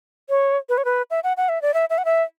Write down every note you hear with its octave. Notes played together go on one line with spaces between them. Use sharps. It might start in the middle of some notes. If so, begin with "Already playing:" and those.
C#5
B4
C#5
B4
E5
F#5
F#5
E5
D5
E5
E5
F#5
E5